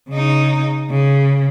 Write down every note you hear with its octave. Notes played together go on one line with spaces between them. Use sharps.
C#3 D#4
C#3